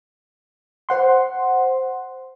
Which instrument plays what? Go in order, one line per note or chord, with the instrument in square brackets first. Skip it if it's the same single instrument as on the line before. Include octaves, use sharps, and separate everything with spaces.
[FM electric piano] C5 F#5 C6